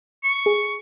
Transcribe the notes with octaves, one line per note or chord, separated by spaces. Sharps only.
C#6
G#4